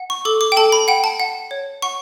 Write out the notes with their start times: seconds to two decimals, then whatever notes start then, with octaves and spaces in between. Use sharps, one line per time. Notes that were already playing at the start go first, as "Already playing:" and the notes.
Already playing: F#5
0.10 C#6
0.25 A4 D6
0.41 D6
0.52 G5
0.57 A4 A5
0.72 B5
0.88 F#5 G5
1.04 A5
1.20 F#5
1.51 C#5
1.82 F#5 C#6